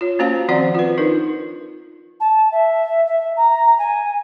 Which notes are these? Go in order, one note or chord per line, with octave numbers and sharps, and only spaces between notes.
F4 C#5
A#3 C#4 F#4 C5 F5 A5
D#3 F3 C4 C5 D5 F#5
F4 B4
D4 D#4 A#4
A5
E5
E5
A#5
G#5